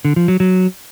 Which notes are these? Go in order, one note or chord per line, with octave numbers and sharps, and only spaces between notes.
D3
F3
F#3
F#3